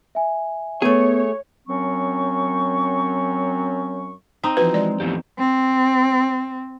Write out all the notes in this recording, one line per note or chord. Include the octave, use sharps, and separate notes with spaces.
E5 G#5
A3 B3 G#4 C#5
F#2 F#3 C4 C#4 C#6
C4 D#4
E3 F3 F#4 B4
G#3 D5
E2 A2 F3 G4
C4